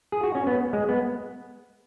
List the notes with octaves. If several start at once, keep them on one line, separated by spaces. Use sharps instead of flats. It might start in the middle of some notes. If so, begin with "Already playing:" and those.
G#4
F#4
C#4
B3
G#3
B3